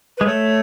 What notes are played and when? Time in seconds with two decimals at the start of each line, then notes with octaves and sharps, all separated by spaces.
0.17 G#3 B4
0.26 A3 C#5